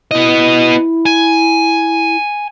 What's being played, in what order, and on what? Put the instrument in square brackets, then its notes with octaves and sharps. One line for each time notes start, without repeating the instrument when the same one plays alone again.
[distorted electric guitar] B3 D#5 [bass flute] E4
[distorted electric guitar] G#5